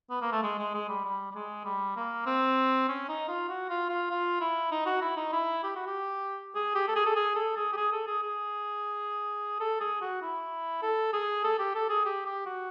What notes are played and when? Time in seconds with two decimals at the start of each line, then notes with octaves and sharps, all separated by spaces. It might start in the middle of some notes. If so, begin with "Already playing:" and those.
0.10 B3
0.21 A#3
0.32 A3
0.43 G#3
0.58 G#3
0.74 G#3
0.89 G3
1.04 G3
1.31 G3
1.35 G#3
1.65 G3
1.96 A#3
2.26 C4
2.88 C#4
3.08 D#4
3.28 F4
3.49 F#4
3.69 F4
3.89 F4
4.11 F4
4.40 E4
4.71 D#4
4.86 F#4
5.01 E4
5.17 D#4
5.33 E4
5.63 G4
5.76 F#4
5.86 G4
6.55 G#4
6.75 G4
6.88 A4
6.96 G#4
7.06 A4
7.16 G#4
7.36 A4
7.56 G#4
7.72 G4
7.76 G#4
7.93 A4
8.07 G#4
8.22 G#4
9.60 A4
9.80 G#4
10.02 F#4
10.22 E4
10.82 A4
11.13 G#4
11.44 A4
11.59 G4
11.75 A4
11.89 G#4
12.05 G4
12.26 G4
12.46 F#4